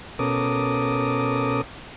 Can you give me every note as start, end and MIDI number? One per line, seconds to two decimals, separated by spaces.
0.19 1.61 47
0.19 1.61 61
0.19 1.61 69
0.19 1.61 70
0.19 1.61 86
0.19 1.61 87